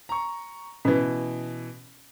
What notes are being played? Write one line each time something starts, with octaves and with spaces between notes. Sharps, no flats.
A#5 C#6
B2 E3 C#4 B4